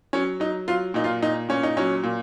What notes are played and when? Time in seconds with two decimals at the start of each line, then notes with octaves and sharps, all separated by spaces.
0.13 F#3 C#4
0.40 F#3 D#4
0.68 F#3 F4
0.94 A#2 D#4
1.04 F4
1.22 A#2 D#4
1.48 A#2 C#4
1.63 D#4
1.77 F#3 C#4
2.03 A#2